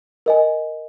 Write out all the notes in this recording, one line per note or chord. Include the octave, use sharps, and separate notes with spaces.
A#4 D#5 G#5